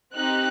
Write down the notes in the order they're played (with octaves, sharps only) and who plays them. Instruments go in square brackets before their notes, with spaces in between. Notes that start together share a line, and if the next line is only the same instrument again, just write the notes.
[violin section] C4 D#4 G4 F#6